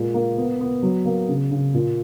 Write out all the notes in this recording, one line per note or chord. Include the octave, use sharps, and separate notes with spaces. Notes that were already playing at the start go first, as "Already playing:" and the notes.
Already playing: A#2 G#3
A#3
B3
B3
F#3
A#3
C#3
C#3
A#2